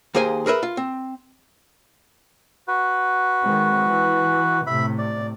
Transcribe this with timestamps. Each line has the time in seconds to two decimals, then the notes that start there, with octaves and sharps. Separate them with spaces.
0.15 D#2 A#3 G#4 C5 G#5
0.46 G#4 A#4 B4 E5
0.63 F4
0.77 C4
2.68 F#4 B4
3.44 D#3 G#3 C4
3.86 E3
4.67 A2 C3 E5 B5
4.98 D5